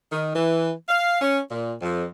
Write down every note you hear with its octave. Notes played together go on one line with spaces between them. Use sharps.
D#3
E3
F5
C#4
A#2
F2